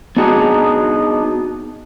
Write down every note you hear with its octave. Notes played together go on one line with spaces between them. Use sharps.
B3 D4 D#4 F#4 G#4